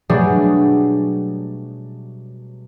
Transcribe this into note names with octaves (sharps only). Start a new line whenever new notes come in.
B2 F#3 G3 A3 D4 G#4